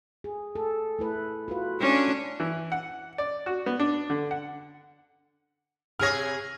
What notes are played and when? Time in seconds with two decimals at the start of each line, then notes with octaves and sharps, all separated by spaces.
0.24 G#4
0.55 A4
0.99 A3 E4 B4
1.48 F4 F#4 B4
1.81 C#4 D4
2.40 E3
2.72 F#5
3.18 D5
3.46 F#4
3.66 B3
3.80 D4
4.10 D3
4.31 F#5
5.99 C3 G#4 C#5 F6 A#6